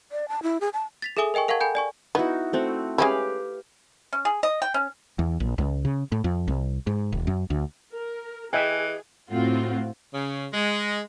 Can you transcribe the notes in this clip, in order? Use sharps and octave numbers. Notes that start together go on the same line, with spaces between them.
D5
A5
E4
G#4
A5
A6 B6 F7
G#4 A4 E5 G#5 D#6 G7
A#4 D#5 G5 G#5 C#6
A#4 F5 F#5 A5 C#6 G#6
A4 G5 G#5 B5 G6
D5 G#5 C#6
B3 D#4 E4 F#4
A3 C4 F#4
G#3 C#4 E4 G4 B4 F5
C#4
G#4
D#5
G5
C#4
E2
A#1
C#2
C#3
A2
F2
C2
G#2
D#1
F#2
D2
A#4
E3 G#4 D#5 E5 G5 G#5
A2 A3 C4 F4 F#4
C#3
G#3